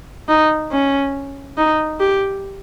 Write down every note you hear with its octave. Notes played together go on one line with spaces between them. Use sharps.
D#4
C#4
D#4
G4